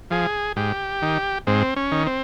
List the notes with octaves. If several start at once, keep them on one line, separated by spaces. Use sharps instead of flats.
F3 G#4
G#2 G4
D#3
G#2 C4
C#4
D#3
C4